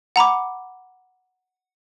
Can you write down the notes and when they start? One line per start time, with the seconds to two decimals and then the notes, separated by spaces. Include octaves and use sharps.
0.16 F#5 A#5 B5 D6